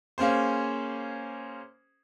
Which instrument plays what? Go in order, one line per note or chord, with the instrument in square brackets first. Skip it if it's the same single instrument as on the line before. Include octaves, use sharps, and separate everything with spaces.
[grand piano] A#3 C#4 G#4 C5